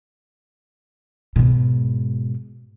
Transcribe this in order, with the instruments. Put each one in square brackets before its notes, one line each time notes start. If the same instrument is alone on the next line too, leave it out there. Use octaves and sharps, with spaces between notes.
[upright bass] G#2 B2